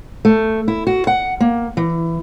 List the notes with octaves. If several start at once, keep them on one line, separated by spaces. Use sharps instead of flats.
A3
E4
F#4
F#5
A#3
E3